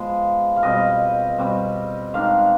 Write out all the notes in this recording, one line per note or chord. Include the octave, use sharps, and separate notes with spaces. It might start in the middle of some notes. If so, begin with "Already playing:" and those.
Already playing: F3 G#3 B3
F5
B2 G3 C4 D#5
B2 G3 C4
D#3 G#3 D4 F5